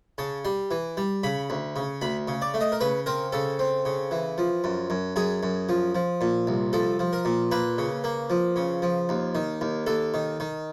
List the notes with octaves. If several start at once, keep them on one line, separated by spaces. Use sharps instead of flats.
C#3 A5
G3 C6
E3
G3
C#3 B5
D2
C#3
D2 B5
C#3
D5
A3
D#5
A#4
C#3 B4
C4 A#4
C#3 A4
C4
C#3
E3
F3
F#2
F#2
F#2 G#4
F#2
F3
F3
A#2
C2
F3 A4
F3
A#4
A#2
A#3 B4
C#3
A#3
F3
C#3
F3
D#2
D#3
D#2
D#2 A4
D#3
D#3